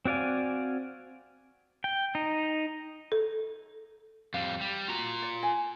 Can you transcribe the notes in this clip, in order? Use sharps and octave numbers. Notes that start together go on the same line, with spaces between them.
C4 F#4 D5 F5 G#5
G5
D#4
A4
F2 G3 F5
G3
F4 F#4 A#5
D5
G#5